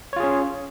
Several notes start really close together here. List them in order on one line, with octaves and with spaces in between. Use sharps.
C#5 F4 G#4 C#4